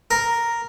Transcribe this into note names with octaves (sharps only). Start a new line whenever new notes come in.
A#4